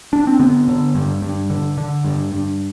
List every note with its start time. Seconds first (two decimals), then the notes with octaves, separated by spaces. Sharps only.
0.13 D4
0.27 C4
0.40 D3 B3
0.68 D3
0.95 G2
1.22 G2
1.50 D3
1.78 D3
2.04 G2
2.33 G2